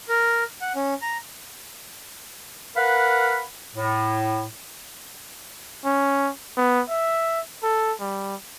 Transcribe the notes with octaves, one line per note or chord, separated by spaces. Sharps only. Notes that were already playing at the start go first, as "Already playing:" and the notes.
A#4
F#5
C#4
A#5
A#4 B4 F5 F#5 B5
A2
C#4
B3
E5
A4
G3